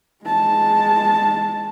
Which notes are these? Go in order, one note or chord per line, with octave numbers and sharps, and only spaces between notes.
G#3 A5